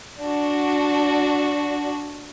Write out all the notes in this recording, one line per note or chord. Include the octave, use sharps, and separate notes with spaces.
D4 F#4